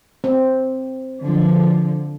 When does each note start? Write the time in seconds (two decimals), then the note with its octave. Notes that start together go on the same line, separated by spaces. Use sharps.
0.24 C4
1.22 D3 F3